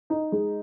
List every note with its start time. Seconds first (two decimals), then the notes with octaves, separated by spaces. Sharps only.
0.10 D#4
0.32 G#3